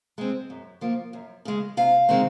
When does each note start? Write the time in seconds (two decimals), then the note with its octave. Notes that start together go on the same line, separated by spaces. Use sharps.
0.18 G#3 C4
0.50 F#2
0.81 F3 A#3
1.13 F#2
1.45 C#3 G#3
1.77 C3 F5
2.09 D#3 G#3 C4